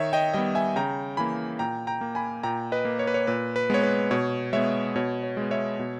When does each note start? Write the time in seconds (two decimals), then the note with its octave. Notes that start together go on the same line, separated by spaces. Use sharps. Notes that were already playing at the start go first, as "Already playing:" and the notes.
Already playing: D#3 C#5 E5
0.13 D#5 G5
0.34 G3 B3 D#5 G5
0.55 E5 G#5
0.76 C#3 G5 A#5
1.17 E3 A#3 G#5 B5
1.59 A#2 G5 A#5
1.87 G5 A#5
2.01 A#3
2.15 G#5 B5
2.43 A#2 G5 A#5
2.72 B4 D#5
2.85 A#3
2.99 C#5
3.07 B4
3.14 C#5
3.27 A#2 B4
3.56 B4
3.70 G#3 B3 C#5
3.83 B4
4.11 B2 C#5
4.53 G#3 B3 C#5 E5
4.96 B2 C#5
5.23 C#5
5.37 G#3 B3
5.51 C#5 E5
5.79 B2